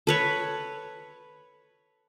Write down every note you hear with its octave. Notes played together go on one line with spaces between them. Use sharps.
A4 B4 C#5